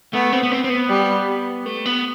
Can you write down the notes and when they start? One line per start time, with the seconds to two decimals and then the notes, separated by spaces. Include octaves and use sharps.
0.13 A3 B3
0.33 C4
0.43 B3
0.52 C4
0.64 C4
0.70 B3
0.90 G3
1.66 A3
1.86 B3